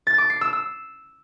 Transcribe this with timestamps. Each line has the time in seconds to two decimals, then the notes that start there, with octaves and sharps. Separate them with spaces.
0.07 A6
0.18 D6
0.30 C7
0.41 E6
0.53 E6